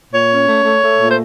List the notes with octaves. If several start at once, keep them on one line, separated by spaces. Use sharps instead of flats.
A#2 C#5
C#4
A3
A3
A3
A#2
C5